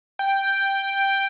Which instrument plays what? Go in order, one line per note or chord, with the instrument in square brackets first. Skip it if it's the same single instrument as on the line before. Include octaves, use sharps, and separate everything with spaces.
[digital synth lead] G5